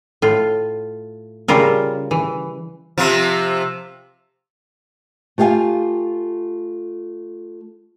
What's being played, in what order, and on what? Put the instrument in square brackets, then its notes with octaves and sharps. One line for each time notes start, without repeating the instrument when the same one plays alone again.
[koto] A2 F4
C#3 G3 E4 F4 A#4
E3
[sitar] C3 F3
[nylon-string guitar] A3 F4 G4 D#5 F5 G#5